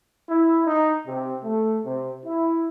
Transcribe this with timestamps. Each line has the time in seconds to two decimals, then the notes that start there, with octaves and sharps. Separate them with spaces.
0.29 E4
0.66 D#4
1.07 C3
1.43 A3
1.84 C3
2.25 E4